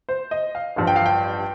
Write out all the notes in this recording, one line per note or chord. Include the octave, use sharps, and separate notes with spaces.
C5
D#5
F5
A1 G2 F3
G5
F5
G5